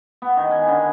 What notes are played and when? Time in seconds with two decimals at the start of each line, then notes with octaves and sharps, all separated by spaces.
0.22 B3
0.37 D#3
0.51 G#5
0.68 D3